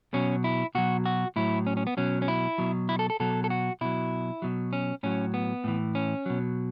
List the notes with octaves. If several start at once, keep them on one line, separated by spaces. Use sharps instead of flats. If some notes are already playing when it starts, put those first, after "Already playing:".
B2 F#3 C#4
E4
B2 F#3 F#4
F#4
A2 F#3 E4
C#4
C#4
B3
B2 F#3 C#4
C#4
E4
B2 F#3
E4
A4
A4
B2 F#3 A4
A4
F#4
B2 F#3 E4
B2 F#3
C#4
A2 F#3 C#4
B3
A2 E3
C#4
B2 F#3